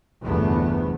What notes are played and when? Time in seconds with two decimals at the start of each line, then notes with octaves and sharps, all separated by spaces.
0.22 G1 E2 C3 A3 B3